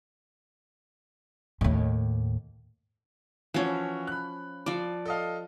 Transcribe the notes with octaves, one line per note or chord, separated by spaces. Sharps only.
D#2 A2
E3 F3 C#4 F#4 C#5
B5 F#6
F3 D5
A4 D#5 F5